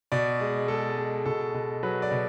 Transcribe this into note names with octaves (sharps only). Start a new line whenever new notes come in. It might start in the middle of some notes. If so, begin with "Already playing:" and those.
B2 D5
G#3
G#3 A4
G#3
B2 A4
B2
F#3 B4
D5
B2